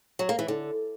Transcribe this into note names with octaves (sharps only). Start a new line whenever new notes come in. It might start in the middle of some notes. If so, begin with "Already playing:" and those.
F#3
A#3
E3
D3